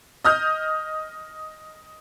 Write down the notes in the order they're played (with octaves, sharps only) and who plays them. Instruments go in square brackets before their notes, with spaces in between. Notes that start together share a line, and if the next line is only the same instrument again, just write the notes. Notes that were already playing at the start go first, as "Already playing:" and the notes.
[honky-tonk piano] D#5 D#6 F6 G6